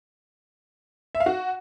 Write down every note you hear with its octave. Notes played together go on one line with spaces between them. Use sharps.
E5
F5
F#4